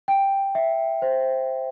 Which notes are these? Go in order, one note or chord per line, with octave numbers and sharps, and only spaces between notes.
G5
E5
C5